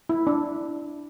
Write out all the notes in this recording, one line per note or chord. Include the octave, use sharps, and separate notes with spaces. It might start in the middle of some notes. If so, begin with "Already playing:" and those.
E4
D4